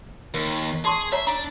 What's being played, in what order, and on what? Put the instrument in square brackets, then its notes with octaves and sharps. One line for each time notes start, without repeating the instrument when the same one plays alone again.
[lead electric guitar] D#2 [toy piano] A#4
[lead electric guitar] G#4 [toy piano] A5 C6 C#6
[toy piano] C#5 A#5 [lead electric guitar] E5
[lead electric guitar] D4 [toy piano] A#5